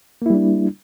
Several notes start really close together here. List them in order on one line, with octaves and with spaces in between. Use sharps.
A#3 E4 G3 D4